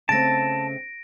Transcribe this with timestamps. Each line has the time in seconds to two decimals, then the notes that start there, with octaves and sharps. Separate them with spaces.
0.09 C#3 A3 C4 A5 A#6 D7